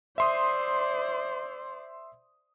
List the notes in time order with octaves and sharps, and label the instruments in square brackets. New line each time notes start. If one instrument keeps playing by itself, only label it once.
[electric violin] C5 D5 [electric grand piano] E5 C6 D#6